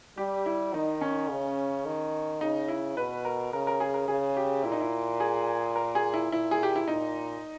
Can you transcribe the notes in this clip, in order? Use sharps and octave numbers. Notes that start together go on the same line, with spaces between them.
G3 G4
E4
D#3 D#4
C#4
C#3
D#3
C#3 D#4
E4
B2 B4
A#4
C#3 A#4
A#4
G#4
A#4
C#3 G#4
G4
A#2 E4
D#4
E4
G#4
A#4
G#4
E4
A#2 E4
G#4
G4
E4
A#2 D#4